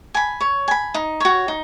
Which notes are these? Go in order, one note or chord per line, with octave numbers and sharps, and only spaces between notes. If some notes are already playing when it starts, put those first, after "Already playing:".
G#5 B5
C#5
G#5 B5
D#4
F#4 C#5
D#4